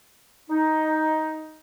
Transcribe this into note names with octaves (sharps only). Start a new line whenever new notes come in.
D#4